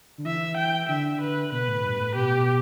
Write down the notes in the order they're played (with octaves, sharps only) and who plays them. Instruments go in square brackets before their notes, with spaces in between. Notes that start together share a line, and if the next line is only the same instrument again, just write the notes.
[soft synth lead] D3
[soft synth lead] E3 [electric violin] E5
[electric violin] G5
[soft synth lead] D3 [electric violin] E5
[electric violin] B4
[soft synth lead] B2 [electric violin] B4
[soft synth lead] A2
G2
A2
[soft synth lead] B2 [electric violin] G4